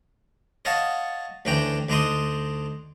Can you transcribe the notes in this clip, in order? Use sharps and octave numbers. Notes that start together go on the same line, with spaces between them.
C#5 D#5 F5 F#5 A5
D2 E3 C#4 D4 G5 A#5
D2 D4 D#4 A#5 C6 D#6